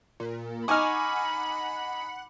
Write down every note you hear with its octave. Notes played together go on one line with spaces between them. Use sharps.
A#2
D#4 F#5 G#5 B5 C#6 D6 F6